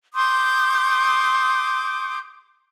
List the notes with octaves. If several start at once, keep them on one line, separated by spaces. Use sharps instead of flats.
C6 D6 D#6 G6